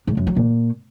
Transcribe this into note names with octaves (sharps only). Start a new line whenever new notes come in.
G#2
F#2
F#3
A#2